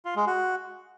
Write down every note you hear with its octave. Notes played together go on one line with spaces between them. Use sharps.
F4
G#3
F#4